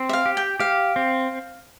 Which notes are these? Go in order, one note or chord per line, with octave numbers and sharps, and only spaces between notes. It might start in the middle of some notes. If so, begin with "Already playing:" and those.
Already playing: C4
E5
F5
G4
G5
G4 F5
C4